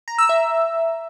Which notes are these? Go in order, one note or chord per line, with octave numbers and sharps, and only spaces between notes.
A#5
E6
E5